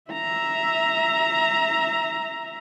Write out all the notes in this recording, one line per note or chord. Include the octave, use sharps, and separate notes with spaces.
E5 A#5